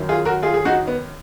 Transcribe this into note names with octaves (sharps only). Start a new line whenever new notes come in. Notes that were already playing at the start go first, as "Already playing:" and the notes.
Already playing: F#2 D#3
F4 G#4
F#4 A#4
F4 G#4
G#4
D#4 F#4
B3